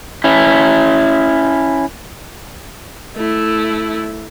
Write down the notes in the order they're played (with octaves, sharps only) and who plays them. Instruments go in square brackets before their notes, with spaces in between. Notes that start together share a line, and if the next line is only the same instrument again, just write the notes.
[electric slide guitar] C#4 E4
[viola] A3 E4